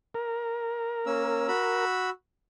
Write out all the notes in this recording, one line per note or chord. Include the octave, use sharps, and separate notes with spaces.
A#4
A#3 C#4 E6
F#4 B5 E6